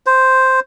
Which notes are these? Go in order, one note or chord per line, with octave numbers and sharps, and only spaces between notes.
C5